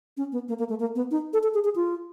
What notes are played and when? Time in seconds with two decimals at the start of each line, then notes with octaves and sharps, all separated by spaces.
0.17 C#4
0.32 B3
0.48 A#3
0.59 A#3
0.69 A3
0.80 A#3
0.95 B3
1.11 D#4
1.33 A4
1.43 A4
1.54 G#4
1.64 G#4
1.76 F4